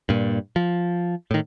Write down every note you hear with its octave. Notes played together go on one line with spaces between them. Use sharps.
G2 A#2
F3
A2 D#3